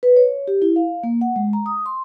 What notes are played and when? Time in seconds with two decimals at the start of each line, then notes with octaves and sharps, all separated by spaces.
0.03 B4
0.17 C#5
0.48 G4
0.62 E4
0.76 F5
1.03 A#3
1.21 F#5
1.36 G#3
1.53 A#5
1.66 D#6
1.86 C6